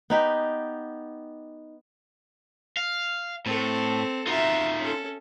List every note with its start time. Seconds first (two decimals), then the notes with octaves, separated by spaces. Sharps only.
0.10 B3 D#4 G4
2.77 F5
3.46 A2 C4 A4
4.27 D#4 F4 F#4 E5
4.81 C#4 A4